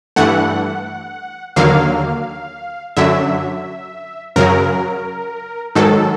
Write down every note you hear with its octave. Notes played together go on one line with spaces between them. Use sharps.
G2 E3 A3 F#5
D#2 D3 F#3 A#3 F5
F#2 D3 F#3 E5
F#2 C#3 F#3 A#4
G#2 D#3 F#3 A4